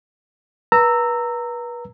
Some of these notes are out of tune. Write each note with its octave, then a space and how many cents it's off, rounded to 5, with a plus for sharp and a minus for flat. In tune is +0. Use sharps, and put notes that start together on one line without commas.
B4 -35 A#5 -20 E6 +0